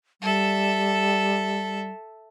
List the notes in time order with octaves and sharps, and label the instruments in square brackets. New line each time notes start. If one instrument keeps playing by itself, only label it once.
[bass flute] G3 [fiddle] A4 E5